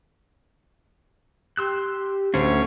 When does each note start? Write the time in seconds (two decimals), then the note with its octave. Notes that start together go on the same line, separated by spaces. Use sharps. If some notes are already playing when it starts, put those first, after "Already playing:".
1.57 G4 C6 E6 F#6
2.34 D2 C#4 D4